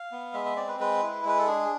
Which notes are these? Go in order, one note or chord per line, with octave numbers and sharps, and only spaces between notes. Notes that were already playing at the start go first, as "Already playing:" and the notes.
Already playing: F5
B3
G#3 E5
E5
C4 D5
B4
G#3 B4
E4
G#3 B4
A4
D4 G#4